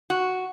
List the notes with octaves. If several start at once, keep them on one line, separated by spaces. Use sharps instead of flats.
F#4